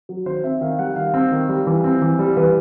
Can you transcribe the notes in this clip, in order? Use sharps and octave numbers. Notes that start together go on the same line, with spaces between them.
F#3
D#3 C5
C4 E5
D#3 F5
G3 F#5
D#3 F5
C4
D#3
G3
E3
C4
E3
G3
E3 B4